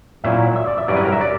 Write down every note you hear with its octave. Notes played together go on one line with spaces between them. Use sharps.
A#2 F#3 C#4 E4 E5
E5
D5
E5
G2 F#3 C#4 E4 D5
B4
A#4
E5
D5